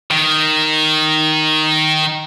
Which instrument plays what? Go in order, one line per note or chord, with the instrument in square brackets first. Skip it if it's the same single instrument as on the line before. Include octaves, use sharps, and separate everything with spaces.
[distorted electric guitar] D#3